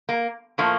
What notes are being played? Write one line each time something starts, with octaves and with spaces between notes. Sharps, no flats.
A#3
A2 F3 A3 A#3